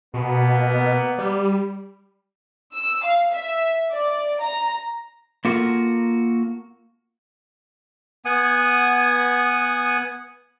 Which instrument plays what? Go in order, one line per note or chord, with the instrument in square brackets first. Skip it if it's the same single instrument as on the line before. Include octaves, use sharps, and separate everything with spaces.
[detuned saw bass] B2 [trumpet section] A#3 B3
[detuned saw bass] G3
[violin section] E6
F5
E5
D5
A#5
[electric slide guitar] A#3 F4 F#4 A4 A#4
[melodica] B3 F#5 G#5 D#6